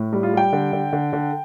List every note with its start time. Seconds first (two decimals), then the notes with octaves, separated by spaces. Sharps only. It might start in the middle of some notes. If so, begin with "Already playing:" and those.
Already playing: A2
0.13 G3
0.23 F4
0.33 G3 G5
0.53 D3
0.73 D3
0.93 D3
1.13 D3